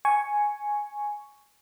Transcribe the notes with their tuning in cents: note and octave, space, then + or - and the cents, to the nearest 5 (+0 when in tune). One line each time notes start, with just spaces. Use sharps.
G#5 +0 C#6 +0